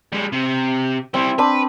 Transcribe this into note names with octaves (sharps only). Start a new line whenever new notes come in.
G3 G#3
C3
G3 C4 E4
C4 D4 B4 B5